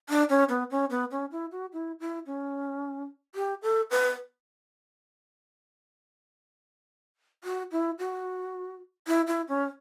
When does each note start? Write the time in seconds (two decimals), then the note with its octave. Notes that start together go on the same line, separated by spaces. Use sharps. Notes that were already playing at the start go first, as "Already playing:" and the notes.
0.10 D4
0.30 C#4
0.49 B3
0.71 C#4
0.91 B3
1.11 C#4
1.32 E4
1.52 F#4
1.73 E4
2.00 E4
2.26 C#4
3.35 G4
3.62 A4
3.91 B4
7.44 F#4
7.72 E4
7.99 F#4
9.08 E4
9.27 E4
9.48 C#4